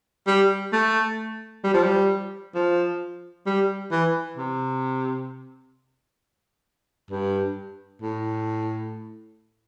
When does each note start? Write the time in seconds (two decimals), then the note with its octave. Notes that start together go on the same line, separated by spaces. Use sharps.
0.27 G3
0.73 A3
1.64 G3
1.74 F3
1.83 G3
2.55 F3
3.46 G3
3.92 E3
4.37 C3
7.11 G2
8.02 A2